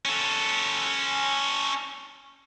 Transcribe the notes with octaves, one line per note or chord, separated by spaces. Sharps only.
C#4 A4